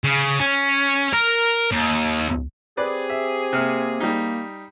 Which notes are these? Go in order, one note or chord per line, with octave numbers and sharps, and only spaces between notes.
C#3
C#4
A#4
D#2
C4 G4 G#4 B4 D5
E5
C3 A#3 F6
G3 A#3 D#4